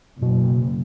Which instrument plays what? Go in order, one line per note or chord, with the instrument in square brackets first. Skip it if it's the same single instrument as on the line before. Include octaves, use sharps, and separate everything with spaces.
[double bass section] F#1 [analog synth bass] B2